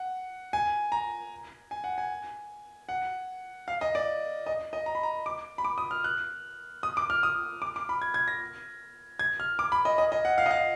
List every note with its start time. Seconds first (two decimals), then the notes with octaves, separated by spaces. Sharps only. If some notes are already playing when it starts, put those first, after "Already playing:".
Already playing: F#5
0.53 G#5
0.92 A#5
1.71 G#5
1.84 F#5
1.98 G#5
2.89 F#5
3.68 F5
3.81 D#5
3.95 D5
4.46 D#5
4.73 D#5
4.86 A#5
4.95 B5
5.03 A#5
5.26 D6
5.58 B5
5.65 D6
5.78 D#6
5.91 F6
6.04 F#6
6.83 D#6
6.97 D6
7.10 F6
7.23 D#6
7.62 D6
7.76 D6
7.89 B5
8.02 G#6
8.14 G#6
8.28 A#6
9.19 G#6
9.40 F6
9.59 D6
9.72 B5
9.85 D#5
9.98 D#5
10.12 D#5
10.25 F#5
10.38 F5
10.46 D#5
10.51 F5